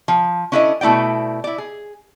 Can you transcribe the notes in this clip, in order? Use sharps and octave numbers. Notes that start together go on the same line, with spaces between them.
F3
C#4 D4 E4 A4 D5 D#5
B2 A3 E4 D5 G5
E4 D5
G#4